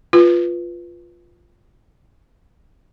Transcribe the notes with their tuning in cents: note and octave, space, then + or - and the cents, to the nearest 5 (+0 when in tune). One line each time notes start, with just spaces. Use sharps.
F4 +0 B4 +0